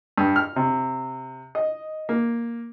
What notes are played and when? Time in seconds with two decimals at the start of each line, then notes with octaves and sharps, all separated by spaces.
0.18 G2
0.36 F6
0.56 C3
1.55 D#5
2.09 A#3